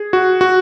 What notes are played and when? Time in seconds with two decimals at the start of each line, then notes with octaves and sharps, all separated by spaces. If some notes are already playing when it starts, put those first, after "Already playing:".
Already playing: G#4
0.13 F#4
0.41 F#4